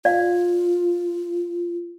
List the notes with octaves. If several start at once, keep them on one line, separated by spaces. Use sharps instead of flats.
F4 D5 F5